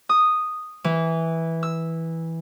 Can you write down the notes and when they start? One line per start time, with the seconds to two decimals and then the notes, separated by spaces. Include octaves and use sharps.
0.09 D#6
0.84 E3
1.63 E6